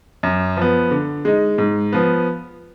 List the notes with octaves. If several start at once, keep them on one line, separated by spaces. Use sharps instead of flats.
F#2
F3 B3
D3
G#3 D#4
G#2
F3 B3